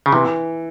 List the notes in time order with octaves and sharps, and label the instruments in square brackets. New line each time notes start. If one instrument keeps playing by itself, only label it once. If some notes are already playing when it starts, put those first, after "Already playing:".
[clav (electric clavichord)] C#3
[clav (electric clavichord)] C3 [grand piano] E3